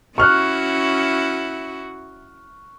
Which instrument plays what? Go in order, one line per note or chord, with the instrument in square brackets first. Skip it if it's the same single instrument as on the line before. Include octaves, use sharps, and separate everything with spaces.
[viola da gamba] C#4 E4 F#4 [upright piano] C#6 F6 F#6